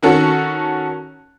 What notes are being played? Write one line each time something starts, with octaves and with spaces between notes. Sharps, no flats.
D#3 C#4 F#4 A4